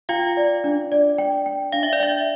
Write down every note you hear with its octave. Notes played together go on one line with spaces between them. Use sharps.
F4 F5 G5
D5
D4
D5
G5
G5
D4 F5
E5
D5
E5 G5